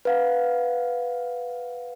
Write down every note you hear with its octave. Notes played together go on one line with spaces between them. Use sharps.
B4 F5 F#5